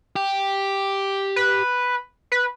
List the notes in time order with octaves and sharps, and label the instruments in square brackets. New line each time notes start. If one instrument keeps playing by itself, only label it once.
[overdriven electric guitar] G4
[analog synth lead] B4
B4